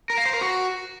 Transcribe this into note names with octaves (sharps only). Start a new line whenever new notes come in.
A#4
F5
C5
A#4
F#4